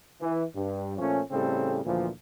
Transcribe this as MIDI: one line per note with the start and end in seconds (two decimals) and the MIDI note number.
0.21 0.43 52
0.55 0.97 43
0.98 1.20 46
0.98 1.20 53
0.98 1.20 57
0.98 1.20 61
1.31 1.80 45
1.31 1.80 49
1.31 1.80 55
1.31 1.80 60
1.31 1.80 69
1.85 2.08 38
1.85 2.08 46
1.85 2.08 52
1.85 2.08 53